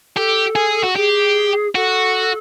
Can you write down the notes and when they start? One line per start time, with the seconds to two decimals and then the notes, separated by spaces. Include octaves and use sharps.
0.16 G4 A4
0.56 G#4
0.84 F#4
0.96 G4 G#4
1.75 F#4 A4